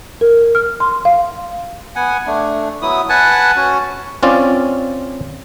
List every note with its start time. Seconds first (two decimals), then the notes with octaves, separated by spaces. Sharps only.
0.21 A#4
0.55 F6
0.80 C6
1.05 F5
1.96 B3 F#5 G#5
2.27 A3 D4
2.82 F#3 B3 E4 D#6
3.09 B4 F#5 G#5 A5
3.57 C#4 F#4
4.23 C4 C#4 F4 D5